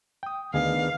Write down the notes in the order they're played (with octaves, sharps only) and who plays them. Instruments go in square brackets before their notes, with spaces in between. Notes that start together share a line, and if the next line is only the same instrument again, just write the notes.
[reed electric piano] G5 D#6
[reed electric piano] D2 G#4 D#5 [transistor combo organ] D#3 B3 D4 [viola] F5